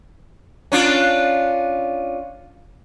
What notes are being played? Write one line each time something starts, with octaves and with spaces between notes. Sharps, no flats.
C#4 D4 F4